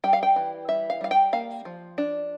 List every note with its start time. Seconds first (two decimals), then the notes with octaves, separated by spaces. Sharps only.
0.04 G3 G5
0.13 F5
0.23 G5
0.36 E3
0.68 G3 E5
0.90 F5
1.01 G3 F5
1.11 G5
1.33 A#3 F5
1.65 F3
1.98 D4